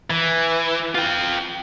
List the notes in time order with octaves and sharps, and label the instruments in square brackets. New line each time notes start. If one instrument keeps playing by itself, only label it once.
[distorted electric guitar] E3
F4 G5